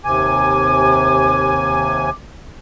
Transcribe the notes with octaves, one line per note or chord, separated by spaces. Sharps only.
D#2 C3 G#5 D6